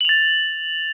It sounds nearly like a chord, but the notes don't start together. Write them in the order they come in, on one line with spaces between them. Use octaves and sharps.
F#7 F7 A6